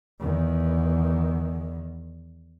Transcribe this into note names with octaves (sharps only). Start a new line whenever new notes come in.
E2 D#3